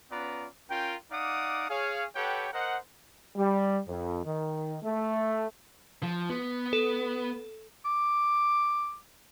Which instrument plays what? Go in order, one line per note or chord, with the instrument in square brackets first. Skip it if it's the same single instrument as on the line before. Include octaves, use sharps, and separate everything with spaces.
[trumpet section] B3 C#4 F4 B4 D5 A#5
C#4 F4 A#4 G5
D#4 D5 F5 F#5 D6 D#6
G#4 C#5 F5
G4 A4 B4 C#5 F#5 G5
A#4 C5 D#5 F#5
[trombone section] G3
F2
D#3
A3
[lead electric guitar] F3
B3
[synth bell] A4
[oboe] D6